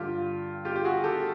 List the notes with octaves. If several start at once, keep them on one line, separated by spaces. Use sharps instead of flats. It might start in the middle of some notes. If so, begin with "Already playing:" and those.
Already playing: G2 D3 G3 F4 G4
F4 G4
G4
F#4 G#4
G4 A4